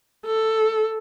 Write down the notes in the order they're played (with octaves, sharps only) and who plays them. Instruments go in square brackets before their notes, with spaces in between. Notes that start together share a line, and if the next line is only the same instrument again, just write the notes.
[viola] A4